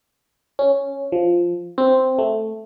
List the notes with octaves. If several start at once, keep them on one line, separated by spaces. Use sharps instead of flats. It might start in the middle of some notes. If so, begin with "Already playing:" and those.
C#4
F3
C4
A3